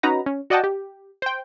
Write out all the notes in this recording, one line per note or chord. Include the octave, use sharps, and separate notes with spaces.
C#4 D#4 F#4 B4 A#5
C#4
F#4 D5 D#5 F#5 G5 A5
G4
C5 G5